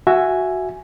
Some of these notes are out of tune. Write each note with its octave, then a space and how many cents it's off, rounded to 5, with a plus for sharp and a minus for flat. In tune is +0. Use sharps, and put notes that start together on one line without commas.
F#4 +0 E5 +10 G#5 +0